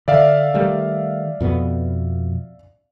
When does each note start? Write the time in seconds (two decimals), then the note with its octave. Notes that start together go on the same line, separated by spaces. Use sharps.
0.08 D3 D5 E5 F5
0.54 D#3 G3 A3
1.41 F2 B2 B3